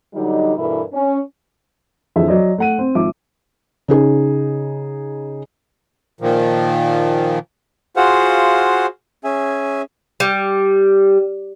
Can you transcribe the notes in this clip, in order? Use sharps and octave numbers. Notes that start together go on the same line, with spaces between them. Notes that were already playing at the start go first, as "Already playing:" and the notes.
D3 F#3 G3 D#4
G2 B2 E3 E4 A4 A#4
C#4
F2 D3 E3 G#4 E5
F#3 D5 D#5
A3 F#5 D#7
C4
G#1 F3 E5 D6
C#3 D#4 G#4
A#2 D#3 F3
F4 F#4 G#4 C5 F5 F#5
C#4 G#4 E5 G#5
G3